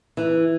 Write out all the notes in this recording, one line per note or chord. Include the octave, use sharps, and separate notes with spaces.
E3